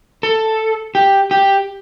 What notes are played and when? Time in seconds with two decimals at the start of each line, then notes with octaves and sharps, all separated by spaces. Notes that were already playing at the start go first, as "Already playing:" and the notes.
0.23 A4
0.95 G4
1.31 G4